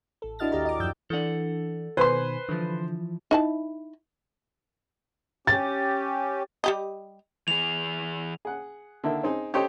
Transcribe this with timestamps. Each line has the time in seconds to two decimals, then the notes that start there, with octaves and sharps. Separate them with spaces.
0.22 A1 A4
0.39 D4 E4 F#4 D#5 F6 A6
0.52 D#2 G4 D5 A#5
0.65 D#5 D6
0.80 F#2 F3 G5 E6 G6
1.10 E3 D4 A4 F#5
1.97 B2 D#3 B4 C5 G#5 C6
2.49 D3 E3 F3
3.31 D#4 E4 A5
5.47 C#4 G4 A6
6.64 G3 G4 D#5
7.48 E3 G#4 F7
8.45 G#4 F#5
9.04 D3 D#3 A#3 E4
9.23 C4 D#4 G#4
9.54 G4 A4 C5 C#5 D#5 G5